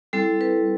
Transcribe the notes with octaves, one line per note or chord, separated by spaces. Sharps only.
G3 C4 E4 A4
B4